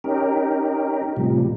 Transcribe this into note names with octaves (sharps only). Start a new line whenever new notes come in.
C#4 D#4 G4 A#4
A2 C3 F3 G3